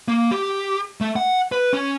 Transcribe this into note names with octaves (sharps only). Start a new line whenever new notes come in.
A#3
G4
A3
F#5
B4
C#4